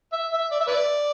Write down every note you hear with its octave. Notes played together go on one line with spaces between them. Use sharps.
E5
E5
D5
E5
B4 D5